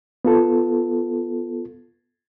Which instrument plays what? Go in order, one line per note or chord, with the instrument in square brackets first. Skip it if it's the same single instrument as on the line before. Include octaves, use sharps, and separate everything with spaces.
[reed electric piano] B3 F4 A4